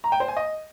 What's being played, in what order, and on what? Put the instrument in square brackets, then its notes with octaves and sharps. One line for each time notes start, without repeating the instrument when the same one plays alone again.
[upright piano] A#5
G5
C5
G#5
D#5